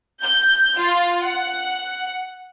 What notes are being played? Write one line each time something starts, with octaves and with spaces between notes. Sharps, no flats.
G6
F4
F#5